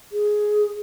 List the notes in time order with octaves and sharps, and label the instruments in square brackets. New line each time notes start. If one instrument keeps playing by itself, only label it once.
[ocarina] G#4